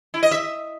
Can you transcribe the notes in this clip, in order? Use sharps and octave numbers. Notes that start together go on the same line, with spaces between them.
E4
D#5
E5